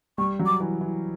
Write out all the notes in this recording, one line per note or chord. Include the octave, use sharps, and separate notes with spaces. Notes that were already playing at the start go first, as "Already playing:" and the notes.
G3 C#6
F#3
D6
E3
E3